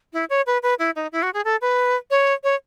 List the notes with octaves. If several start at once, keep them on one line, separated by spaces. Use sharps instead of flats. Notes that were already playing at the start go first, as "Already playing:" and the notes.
E4
C#5
B4
B4
E4
D#4
E4
F#4
G#4
A4
B4
C#5
C#5